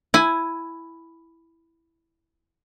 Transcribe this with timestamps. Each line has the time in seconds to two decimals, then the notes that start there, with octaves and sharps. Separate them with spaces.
0.14 E4 G#5